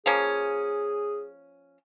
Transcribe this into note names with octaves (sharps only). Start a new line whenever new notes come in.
F3 A#3 C#4 G#4